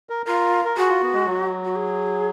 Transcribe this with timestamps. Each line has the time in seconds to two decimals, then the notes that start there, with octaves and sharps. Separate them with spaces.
0.10 A#4
0.26 F4 A#4
0.65 A#4
0.77 F#4 G#4
0.89 F4
1.02 B3
1.14 G#3
1.26 F#3
1.65 F#4
1.76 G#4